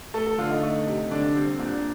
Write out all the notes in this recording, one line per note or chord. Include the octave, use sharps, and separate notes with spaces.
A3 A4
A4
D3 F4
D#4
A3
C3
D3 D4
G3 C4
A#2 D4